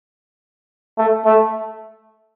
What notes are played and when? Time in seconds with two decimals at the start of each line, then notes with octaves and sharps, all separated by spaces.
0.98 A3
1.25 A3